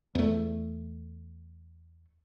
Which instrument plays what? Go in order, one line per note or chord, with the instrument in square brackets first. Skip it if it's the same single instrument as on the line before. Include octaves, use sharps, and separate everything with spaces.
[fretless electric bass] E2 A3